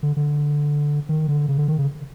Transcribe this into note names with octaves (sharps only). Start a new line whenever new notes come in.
D3
D3
D#3
D3
C#3
D3
D#3
C#3